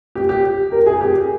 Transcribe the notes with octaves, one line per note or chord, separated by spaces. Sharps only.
G4
G4
A#4
G#4
G4